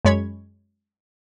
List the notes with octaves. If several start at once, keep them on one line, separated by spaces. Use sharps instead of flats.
F#2 G#3 C#5 B5 G#6